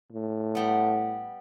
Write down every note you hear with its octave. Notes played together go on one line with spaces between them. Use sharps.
A2
G3 B3